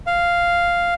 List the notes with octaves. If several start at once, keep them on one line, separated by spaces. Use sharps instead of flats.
F5